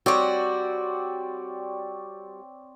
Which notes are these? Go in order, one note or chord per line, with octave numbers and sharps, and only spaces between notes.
G3 C4 F#4 C#5 D5